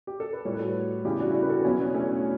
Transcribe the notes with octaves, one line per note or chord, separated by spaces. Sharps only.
G4
A4
B4
A2 G3 A4 C#5
B4
F#4 A4
E2 C#3 E3 G3 E4 G4
D4 F#4
E4
D4 F#4
B4
F#4 A4
E2 B2 F#3 C#4 E4
B3 D4
A3 C#4